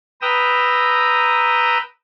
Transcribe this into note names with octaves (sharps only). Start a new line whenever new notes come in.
B4 G5 A#5 D#6 E6